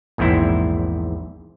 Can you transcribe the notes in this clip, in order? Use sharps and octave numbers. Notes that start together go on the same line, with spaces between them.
A#1 E2 G#2 C4 E4